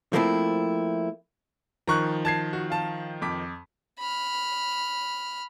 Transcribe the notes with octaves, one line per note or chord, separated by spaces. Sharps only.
F3 A3 A#3 C4 E4
D#3 F3 A#5 C#6 F#6
A5 G#6 C7
F#4
F5 A5
F2 D6 B6
B5 F6